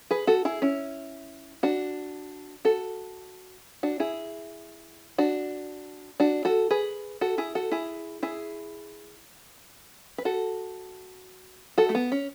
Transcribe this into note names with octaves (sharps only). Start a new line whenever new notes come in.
G#4 B4
F#4 A4
E4 G#4
C#4 E4
D4 F#4
F#4 A4
D4 F#4
E4 G#4
D4 F#4
D4 F#4
F#4 A4
G#4 B4
F#4 A4
E4 G#4
F#4 A4
E4 G#4
E4 G#4
B4
F#4 A4
F#4 A4
A3
B3
C#4